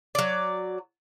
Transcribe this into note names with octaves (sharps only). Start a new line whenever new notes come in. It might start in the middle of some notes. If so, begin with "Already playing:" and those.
F#3 D5